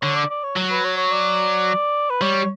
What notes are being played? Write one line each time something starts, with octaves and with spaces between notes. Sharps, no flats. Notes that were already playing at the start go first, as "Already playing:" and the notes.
D3 C#5
D5
D5
C#5
F#3
B4
C#5
C#5
D5
B4
G3 C#5